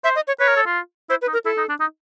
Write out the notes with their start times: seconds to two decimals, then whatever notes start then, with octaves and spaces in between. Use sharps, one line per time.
0.04 C5 E5
0.15 D#5
0.28 C#5
0.39 B4 C#5
0.48 A#4
0.57 A4
0.66 F4
1.09 E4 C5
1.22 B4
1.27 D#4
1.33 A#4
1.45 E4 A4
1.57 D#4
1.69 D4
1.80 D#4